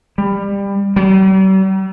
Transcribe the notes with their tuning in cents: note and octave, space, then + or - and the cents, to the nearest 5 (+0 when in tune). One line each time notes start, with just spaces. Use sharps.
G3 +25
G3 -45